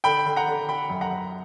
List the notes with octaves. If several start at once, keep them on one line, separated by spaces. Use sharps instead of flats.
D3 G5 B5
D3
F#5 A#5
D3
D3 G5 B5
F#2
F#5 A#5
F#2